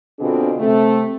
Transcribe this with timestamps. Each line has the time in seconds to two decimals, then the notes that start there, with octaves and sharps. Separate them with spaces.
0.19 B2 D3 C4 D4 F4 G#4
0.59 C3 A3 C4